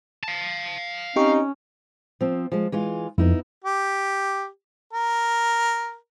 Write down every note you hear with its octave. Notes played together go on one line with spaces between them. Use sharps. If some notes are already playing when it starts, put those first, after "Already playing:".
F5 A5
C4 C#4 D#4 G4 C#6
F3 C4
F3 G#3
E3 G#3 F4
F2 B3 D#4 E4
G4
A#4